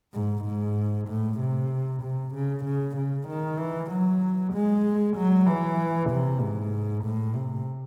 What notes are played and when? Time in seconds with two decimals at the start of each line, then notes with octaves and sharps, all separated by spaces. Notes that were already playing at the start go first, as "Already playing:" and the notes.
0.14 G#2
0.45 G#2
1.09 A2
1.40 C3
2.03 C3
2.34 C#3
2.65 C#3
2.97 C#3
3.28 D#3
3.59 E3
3.91 F#3
4.53 G#3
5.17 F#3
5.47 E3
6.10 C3
6.42 G#2
7.04 A2
7.35 C3